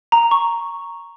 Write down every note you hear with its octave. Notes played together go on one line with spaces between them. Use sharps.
A#5
C#6